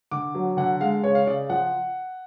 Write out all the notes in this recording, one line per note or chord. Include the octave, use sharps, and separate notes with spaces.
D3 D6
F#3
D3 F#5
G#3 F5
C#3 C#5
F5
C#3 D5
F3 F#5